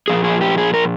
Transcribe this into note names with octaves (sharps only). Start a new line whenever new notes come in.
A#2 F3 G#4
G#4
G4
G#4
A#4